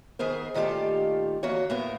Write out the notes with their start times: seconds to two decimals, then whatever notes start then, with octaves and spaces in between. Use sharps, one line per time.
0.19 D#3 B3 G#4 A#4 C5
0.54 A#2 D#3 A3 F4 G4 A4
1.43 D2 E3 A#3 B3 F#4 C#5
1.70 A2 A#3 B3 A#4